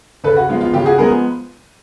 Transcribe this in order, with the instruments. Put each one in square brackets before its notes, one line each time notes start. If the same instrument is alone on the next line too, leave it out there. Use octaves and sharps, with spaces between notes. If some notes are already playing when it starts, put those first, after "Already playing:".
[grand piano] C#3 A4 B4
F#4
F3 G#3 B3 F4
F4
C#3 F4 G4
F#4 G#4
F3 G#3 B3 G#4 A#4